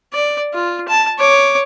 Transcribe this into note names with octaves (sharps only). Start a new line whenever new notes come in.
D5
F4
A5
C#5 D6